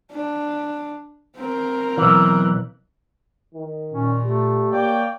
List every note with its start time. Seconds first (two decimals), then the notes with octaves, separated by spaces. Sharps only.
0.11 D4
1.36 C4 A#4
1.97 B1 E3
3.55 D#3
3.92 A#2 C#4
4.25 A3 G4
4.72 A#3 C#5 D5 G5